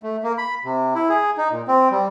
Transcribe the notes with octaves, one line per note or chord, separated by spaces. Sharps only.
A3
A#3
B5
C3
E4
G#4
D#4
A#2
C4
G3